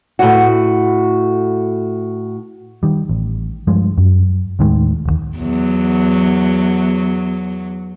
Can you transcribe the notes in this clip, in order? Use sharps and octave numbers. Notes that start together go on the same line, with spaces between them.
A2 F#4
D#3 G3
A1
G2 F3 G#3
F#2
D#2 A2 D#3 G#3
E1 D#2
E2 F#3